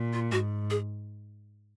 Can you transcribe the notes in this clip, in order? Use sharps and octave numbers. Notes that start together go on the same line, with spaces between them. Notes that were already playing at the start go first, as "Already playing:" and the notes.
Already playing: A#2
F4
G#2 F#4
G#4